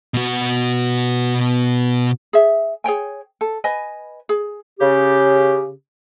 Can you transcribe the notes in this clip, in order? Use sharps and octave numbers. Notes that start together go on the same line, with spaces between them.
B2 F#4
G#4 E5
G#4 C#5 G5 G#5
A4
B4 D#5 G#5
G#4
C#3 G4